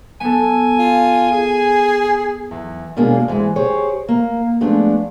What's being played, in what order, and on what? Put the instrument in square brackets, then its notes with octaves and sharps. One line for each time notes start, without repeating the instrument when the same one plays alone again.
[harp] B3 A4 [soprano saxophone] G#5
[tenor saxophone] F4
G#4
[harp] E2
[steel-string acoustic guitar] D#2 B2 G#3 A#3 D4 G#4
G#2 E3 F#3 G#3
G4 G#4 C5 C#5
A#3
F3 G#3 A3 B3 D4